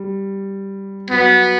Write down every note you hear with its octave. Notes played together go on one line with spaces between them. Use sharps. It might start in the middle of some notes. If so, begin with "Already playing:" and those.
Already playing: G3
F#3 B3